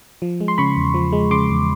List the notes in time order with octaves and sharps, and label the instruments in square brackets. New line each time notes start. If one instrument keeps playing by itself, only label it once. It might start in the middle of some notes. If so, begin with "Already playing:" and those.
[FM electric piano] F3
G#3
C6
C#3 B5 C#6
E2
F3
G#3
C#3 C6 D6
E2